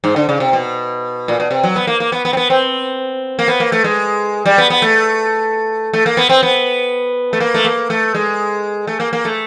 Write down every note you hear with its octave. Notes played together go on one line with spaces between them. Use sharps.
G#2
D3
C#3
C3
B2
A#2
B2
C3
F#3
B3
A#3
A#3
B3
B3
C4
B3
C4
A#3
B3
A#3
A3
G#3
G3
B3
B3
A3
A3
A#3
B3
C4
B3
A3
A#3
A3
A#3
A3
G#3
A3
A#3
A#3
A3